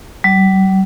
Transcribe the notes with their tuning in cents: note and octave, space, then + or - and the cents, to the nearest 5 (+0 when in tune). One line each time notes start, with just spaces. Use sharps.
G3 -45